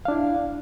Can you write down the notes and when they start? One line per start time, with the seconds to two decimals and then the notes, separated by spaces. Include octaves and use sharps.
0.05 F5
0.08 D4
0.11 E4